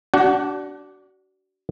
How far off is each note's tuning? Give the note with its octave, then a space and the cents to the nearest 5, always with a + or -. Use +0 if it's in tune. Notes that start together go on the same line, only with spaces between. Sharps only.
D4 -15 F#4 +35 F#5 +0